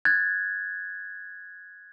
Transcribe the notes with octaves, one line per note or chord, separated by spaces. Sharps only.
F#6 G#6 A6